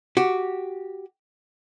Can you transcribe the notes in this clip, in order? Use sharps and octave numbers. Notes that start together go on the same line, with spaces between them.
F#4 G4